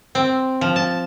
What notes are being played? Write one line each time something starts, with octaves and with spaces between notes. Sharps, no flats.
C4
F3
A5